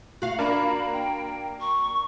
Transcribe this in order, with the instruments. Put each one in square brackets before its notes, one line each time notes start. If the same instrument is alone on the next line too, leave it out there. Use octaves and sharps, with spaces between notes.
[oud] F#4 F5
[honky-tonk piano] A#3 D4 [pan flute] B5
[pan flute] G5
C#6